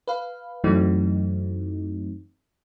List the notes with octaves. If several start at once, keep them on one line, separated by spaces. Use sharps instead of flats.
B4 F5
F#2 E3 F#3 A3 C4 D#4